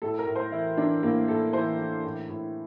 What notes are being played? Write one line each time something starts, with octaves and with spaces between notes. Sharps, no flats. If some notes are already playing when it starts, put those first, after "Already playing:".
A2 A4
A#4
A2
C5
E3 E4
E3 D4
A2 A#3
A2 A4
E3 C5
E3
A2
A2